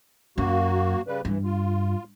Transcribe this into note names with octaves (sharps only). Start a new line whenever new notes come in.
F#2 A#3 F#4
C#3 G3 B4
G2 E3
F4